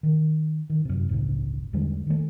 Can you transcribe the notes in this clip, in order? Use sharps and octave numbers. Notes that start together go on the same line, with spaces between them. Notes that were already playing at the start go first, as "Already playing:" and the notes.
D#3
D#3
F#2 C3
G1 C#2 A2 C#3
E2 D3 G3 G#3
D#3 A3